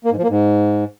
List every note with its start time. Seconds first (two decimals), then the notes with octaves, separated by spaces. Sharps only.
0.05 A#3
0.11 G#2
0.17 F3
0.23 A#3
0.29 G#2